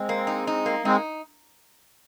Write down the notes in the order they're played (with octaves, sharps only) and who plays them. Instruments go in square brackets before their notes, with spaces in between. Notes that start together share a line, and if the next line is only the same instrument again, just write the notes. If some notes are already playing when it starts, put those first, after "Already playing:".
Already playing: [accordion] G#3 C4
[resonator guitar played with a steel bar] A#3
D#4
D#4
A#3
[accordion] G#3 C4 [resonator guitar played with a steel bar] D#4